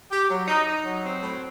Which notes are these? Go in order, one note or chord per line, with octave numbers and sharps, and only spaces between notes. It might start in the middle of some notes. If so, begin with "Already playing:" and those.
G4
F#3
D#4
D#4
F#3
C4
A2